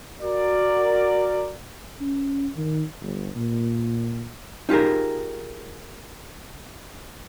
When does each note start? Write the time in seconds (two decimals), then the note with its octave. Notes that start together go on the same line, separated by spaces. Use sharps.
0.21 F#4 A#4 D5
1.99 C#4
2.54 D#3
3.00 G1
3.34 A#2
4.69 D#4 F4 G4 G#4 A#4